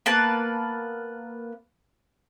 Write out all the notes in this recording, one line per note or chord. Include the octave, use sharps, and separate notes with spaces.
A#3 B3 B4 A5